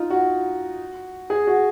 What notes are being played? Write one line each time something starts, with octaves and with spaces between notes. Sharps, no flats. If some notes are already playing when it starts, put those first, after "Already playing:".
Already playing: D#4 F4
F#4
G#4
F#4